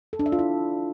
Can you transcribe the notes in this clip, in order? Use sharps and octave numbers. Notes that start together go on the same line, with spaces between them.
A4
D4
E5
F4
E4